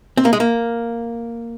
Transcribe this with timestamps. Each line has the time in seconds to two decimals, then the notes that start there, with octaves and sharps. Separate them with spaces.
0.17 C4
0.25 A#3
0.33 G#3
0.40 A#3